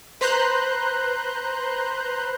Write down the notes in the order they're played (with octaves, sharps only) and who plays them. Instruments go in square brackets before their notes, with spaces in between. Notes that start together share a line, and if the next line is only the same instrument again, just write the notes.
[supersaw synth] B4 C5 A#5 C6 F#6 G6